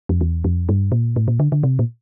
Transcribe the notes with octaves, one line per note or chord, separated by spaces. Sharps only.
F2
E2
F2
G2
A#2
A2
A#2
D3
D3
C3
A#2